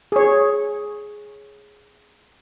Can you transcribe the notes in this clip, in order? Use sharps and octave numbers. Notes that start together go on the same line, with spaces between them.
G#4 C#5